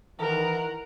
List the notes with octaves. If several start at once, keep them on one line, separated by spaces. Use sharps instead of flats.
D#3 E3 A#4 F#5